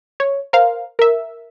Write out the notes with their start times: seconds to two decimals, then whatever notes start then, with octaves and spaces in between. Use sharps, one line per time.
0.20 C#5
0.53 A#4 C5 F5
0.99 A#4 E5